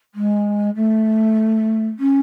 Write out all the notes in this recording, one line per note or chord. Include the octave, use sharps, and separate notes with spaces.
G#3
A3
C#4